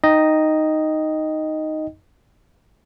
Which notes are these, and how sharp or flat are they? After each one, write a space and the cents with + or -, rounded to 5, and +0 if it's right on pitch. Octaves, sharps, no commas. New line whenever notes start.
D#4 +0 D#5 +0 G5 +0